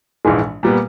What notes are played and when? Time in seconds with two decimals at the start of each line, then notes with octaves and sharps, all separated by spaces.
0.25 A#1 G#2 E3 G#3
0.63 A#2 G3 B3